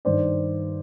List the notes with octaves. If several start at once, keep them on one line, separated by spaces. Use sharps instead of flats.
G2 D#3 C5 D5